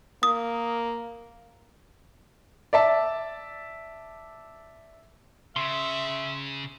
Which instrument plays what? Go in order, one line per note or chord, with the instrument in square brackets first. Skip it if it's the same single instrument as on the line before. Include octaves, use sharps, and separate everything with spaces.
[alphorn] A#3 [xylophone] D#6
[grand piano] D5 E5 A5
[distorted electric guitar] C#3 [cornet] E5 [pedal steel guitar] C6